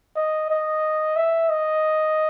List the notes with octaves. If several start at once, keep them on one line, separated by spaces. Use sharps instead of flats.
D#5
D#5
E5
D#5